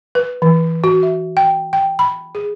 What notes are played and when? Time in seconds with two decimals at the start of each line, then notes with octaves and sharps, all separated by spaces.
0.15 B4
0.42 E3
0.84 F#4
1.03 E5
1.37 G5
1.73 G5
1.99 B5
2.35 G#4